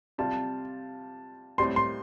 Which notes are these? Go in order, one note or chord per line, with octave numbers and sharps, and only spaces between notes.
C3 G3 F4 A5
A2 G3 C4 C6
C6